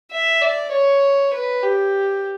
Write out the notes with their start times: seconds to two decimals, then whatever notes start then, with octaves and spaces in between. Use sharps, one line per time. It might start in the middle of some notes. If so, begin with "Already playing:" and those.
0.12 E5
0.41 D5
0.72 C#5
1.34 B4
1.63 G4